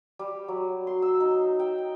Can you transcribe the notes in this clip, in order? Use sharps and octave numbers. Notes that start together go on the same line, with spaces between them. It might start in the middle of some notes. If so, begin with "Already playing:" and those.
G3
F#3
C6
E6
D#4
G5
G5